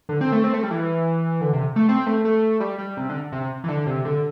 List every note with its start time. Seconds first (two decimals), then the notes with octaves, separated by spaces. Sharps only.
0.09 D3
0.21 C4
0.32 A3
0.44 C4
0.53 A3
0.63 G3
0.71 E3
1.41 D3
1.53 C3
1.76 A3
1.89 C4
2.06 A3
2.25 A3
2.60 G3
2.78 G3
2.97 C3
3.09 D3
3.32 C3
3.64 E3
3.68 D3
3.86 C3
4.05 D3